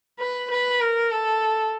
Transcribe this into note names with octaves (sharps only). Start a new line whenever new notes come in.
B4
B4
A#4
A4